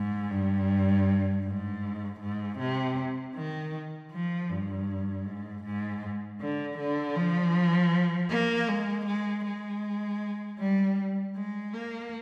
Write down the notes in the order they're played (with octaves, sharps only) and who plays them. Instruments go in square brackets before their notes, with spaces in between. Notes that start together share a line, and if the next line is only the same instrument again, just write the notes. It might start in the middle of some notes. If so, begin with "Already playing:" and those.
Already playing: [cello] G#2
G2
G#2
G#2
C3
D#3
F3
G2
G#2
G#2
D3
D3
F3
A#3
G#3
G#3
G#3
G3
G#3
A#3